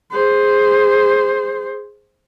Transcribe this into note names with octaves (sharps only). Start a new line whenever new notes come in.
G#4 C5